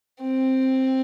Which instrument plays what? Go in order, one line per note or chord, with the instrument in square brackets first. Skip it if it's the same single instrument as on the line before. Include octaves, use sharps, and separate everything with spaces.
[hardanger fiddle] C4